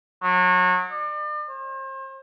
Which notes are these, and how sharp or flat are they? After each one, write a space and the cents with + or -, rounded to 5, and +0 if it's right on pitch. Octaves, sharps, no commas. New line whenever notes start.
F#3 -30
D5 +40
C5 +40